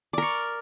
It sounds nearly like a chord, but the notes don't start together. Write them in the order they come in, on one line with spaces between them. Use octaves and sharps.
D5 A#4 C#6